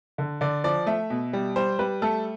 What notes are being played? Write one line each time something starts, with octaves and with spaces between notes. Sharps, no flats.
D3
D3 D5
F3 D5
A3 E5
B2
G3
G3 C5
G3 B4
A3 A4